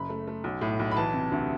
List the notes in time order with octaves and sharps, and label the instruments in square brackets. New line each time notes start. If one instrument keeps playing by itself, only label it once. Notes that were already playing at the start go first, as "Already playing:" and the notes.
Already playing: [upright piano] F#1 B5
A3
A3
B1
A2
B1
B5
E3 A5
C3
D2